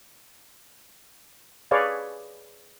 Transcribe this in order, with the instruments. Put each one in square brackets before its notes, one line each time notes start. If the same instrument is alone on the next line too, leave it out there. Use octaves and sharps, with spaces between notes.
[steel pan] G#4 B4 C#5 D5 F5